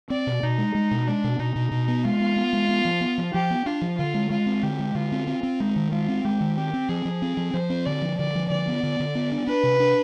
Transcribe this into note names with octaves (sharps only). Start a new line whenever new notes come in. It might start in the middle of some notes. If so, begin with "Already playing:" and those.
C4 D5
B2
B2 D#4
G#3
G#3
B2
G#3 D4
B2
B2 D#4
B2
B2
B3
G#3 F4
B3
B3
G#3
B3
F3
B3
F3
F3 G4
B3
D4 F4
F3
D3 F4
G#3
G#3 F4
C4
D3 G4
G#3
D3 F4
C4
C4
C4
G#3 D#4
D#3
G#3 F4
C4
G#3 G4
D#3
C4 G4
C4
F3 G#4
F3
C4
F3
F3 C5
C4
D3 D5
F3
D3 D5
F3
D3 D5
B3
D3
D3
B3
D4
D4 B4
C3
D4